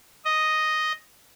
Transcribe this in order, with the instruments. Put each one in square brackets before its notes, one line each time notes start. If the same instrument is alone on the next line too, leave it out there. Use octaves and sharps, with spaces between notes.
[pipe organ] D#5